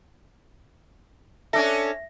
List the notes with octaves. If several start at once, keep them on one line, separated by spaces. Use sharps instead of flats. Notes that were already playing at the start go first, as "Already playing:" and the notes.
C#4 D4 A4 E5 A#6